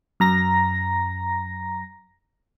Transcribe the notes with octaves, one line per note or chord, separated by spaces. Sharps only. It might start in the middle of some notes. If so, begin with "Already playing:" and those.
F#2 A#5 A#6